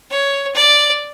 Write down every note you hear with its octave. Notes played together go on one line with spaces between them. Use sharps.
C#5
D5